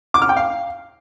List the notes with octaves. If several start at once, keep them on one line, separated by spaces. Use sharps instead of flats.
D6
F6
G5
F5